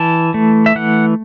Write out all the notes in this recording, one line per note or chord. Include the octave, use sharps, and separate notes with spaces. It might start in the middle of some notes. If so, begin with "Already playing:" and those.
Already playing: E3 A5
A3
E5
E3 F#5